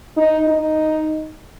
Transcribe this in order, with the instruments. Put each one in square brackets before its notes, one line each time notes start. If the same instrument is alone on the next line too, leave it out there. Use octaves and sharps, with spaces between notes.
[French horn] D#4
D#4